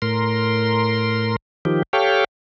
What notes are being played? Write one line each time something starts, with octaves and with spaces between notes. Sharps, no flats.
A2 A#4 C6
D#3 F3 G4
G4 A4 C#5 F5 G5